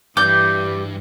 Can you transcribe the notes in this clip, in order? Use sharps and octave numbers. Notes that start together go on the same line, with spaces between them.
G2 E3 G4 D5 D6 G6